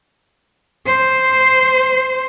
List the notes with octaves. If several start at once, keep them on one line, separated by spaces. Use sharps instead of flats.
C5